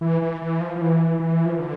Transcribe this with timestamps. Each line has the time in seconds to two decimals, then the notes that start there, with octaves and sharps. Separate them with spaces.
0.01 E3
0.22 E3
0.42 E3
0.60 F3
0.76 F3
0.81 E3
1.20 E3
1.46 F3
1.52 E3
1.59 D3